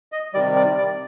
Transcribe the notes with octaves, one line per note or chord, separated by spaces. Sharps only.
D#5
C3 D#3 G3 D5
D5
D5